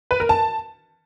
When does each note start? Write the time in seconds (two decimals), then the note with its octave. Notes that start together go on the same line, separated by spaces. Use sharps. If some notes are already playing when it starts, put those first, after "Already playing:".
0.11 B4
0.20 A#4
0.29 A5